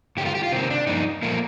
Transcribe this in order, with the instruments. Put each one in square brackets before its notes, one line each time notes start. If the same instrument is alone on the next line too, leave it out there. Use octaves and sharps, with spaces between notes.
[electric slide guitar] G2 D3 A3 G4
F4
G4
F4
C3 D#3 A#3 C4
D4
G2 F3 A#3 D#4
A#2 F3 A3 A#3